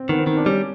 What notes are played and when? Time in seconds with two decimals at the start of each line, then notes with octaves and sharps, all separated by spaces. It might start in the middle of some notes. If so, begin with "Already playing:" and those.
Already playing: C4
0.09 D#3 B3
0.18 C4
0.27 D#3
0.37 D4
0.46 G3 C#4